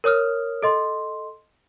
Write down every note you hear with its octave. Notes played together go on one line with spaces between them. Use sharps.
A#4 C#5 D#6 F6
A4 D#5 C6